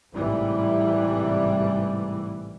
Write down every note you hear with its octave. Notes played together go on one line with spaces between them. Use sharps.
A1 G#2 C3 E3 G3